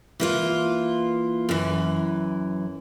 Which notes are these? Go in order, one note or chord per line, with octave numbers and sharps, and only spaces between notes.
E3 A#3 F4
F#2 E3